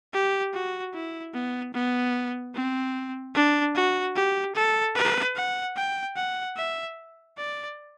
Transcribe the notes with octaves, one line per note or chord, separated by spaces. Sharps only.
G4
F#4
E4
B3
B3
C4
D4
F#4
G4
A4
B4
F#5
G5
F#5
E5
D5